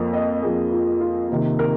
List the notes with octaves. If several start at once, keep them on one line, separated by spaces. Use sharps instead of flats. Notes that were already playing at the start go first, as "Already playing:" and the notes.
Already playing: F2 F3 A#3 F4
D#5
F2 F3 A#3 G#4
F4
F4
C3 D#3 A#3
A#4